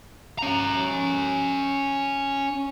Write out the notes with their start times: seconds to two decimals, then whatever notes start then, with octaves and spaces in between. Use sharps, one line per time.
0.39 C#4 A#5